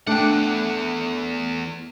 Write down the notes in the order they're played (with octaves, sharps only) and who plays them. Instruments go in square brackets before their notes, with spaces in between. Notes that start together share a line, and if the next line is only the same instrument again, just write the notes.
[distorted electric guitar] E2 F#5 [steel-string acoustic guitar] A3 [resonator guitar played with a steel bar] D4 G5